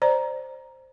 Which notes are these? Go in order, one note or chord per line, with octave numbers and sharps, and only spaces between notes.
C5 D5 A#5